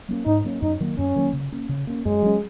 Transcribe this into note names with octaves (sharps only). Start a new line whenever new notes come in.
F#3 A#3 C#4
G#2 D#4
F#3 A#3 C#4
F#2 D#4
D#3 F#3 A#3
F#2 C#4
D#3 F#3 A#3
C#3
A#3 C#4
C#3
A#3 C#4
F#2 G#3
F#3 C#4